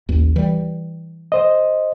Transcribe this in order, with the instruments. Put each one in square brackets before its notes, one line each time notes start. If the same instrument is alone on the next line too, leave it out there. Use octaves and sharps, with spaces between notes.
[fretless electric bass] A1 D#2
E3 G3
[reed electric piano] C5 D#5